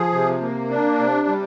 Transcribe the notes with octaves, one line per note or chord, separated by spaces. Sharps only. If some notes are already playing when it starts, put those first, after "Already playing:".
Already playing: F3 G#4
C3
A#3
D4
C3
G3